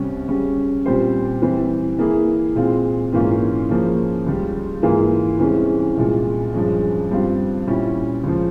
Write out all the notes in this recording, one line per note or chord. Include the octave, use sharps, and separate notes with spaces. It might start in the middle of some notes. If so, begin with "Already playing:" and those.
Already playing: C2 C3 G3 C#4
C#3 G3 C#4
A#2 G3 C4 G4 C5
E3 G3 C4
E3 A#3 E4 G#4
A#2 G#3 C4 F4
G#2 E3 A#3 C#4 F4
C#3 F3 A#3 C#4
C#2 C#3 G3
G#2 E3 A#3 F4 G#4
C2 C3 E3 G#3 C#4
C2 A#2 G#3
G2 F3 G#3 C#4
G2 G3 C4 F4
A#2 G3 C#4 E4
C#2 C#3 F3